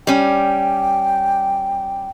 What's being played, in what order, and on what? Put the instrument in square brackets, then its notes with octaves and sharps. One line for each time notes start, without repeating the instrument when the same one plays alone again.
[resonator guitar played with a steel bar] G3 C#4 [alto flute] G5